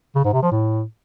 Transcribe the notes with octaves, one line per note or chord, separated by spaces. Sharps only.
C#3
G#2
C3
F3
A2